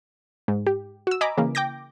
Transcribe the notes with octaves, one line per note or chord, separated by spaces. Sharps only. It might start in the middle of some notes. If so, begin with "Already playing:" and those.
G#2
G4
F#4 E6
D#5 G#5 A#5 B5 D6
C#3 E3 A#3
G5 D6 G6 A#6